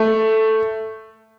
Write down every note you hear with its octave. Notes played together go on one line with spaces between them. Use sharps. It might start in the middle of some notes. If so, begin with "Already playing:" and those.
Already playing: A3